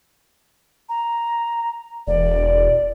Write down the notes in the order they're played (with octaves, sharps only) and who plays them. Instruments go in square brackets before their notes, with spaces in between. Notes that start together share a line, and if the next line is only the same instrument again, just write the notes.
[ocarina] A#5
[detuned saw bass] E1 [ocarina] D5